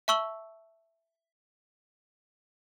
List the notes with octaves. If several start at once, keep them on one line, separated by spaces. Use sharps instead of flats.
E5 A5 C#6 E6 F#7 G7